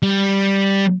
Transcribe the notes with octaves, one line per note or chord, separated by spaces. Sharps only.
G3